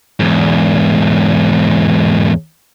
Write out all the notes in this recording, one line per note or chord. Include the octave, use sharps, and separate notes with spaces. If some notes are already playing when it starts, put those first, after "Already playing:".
E2 G#2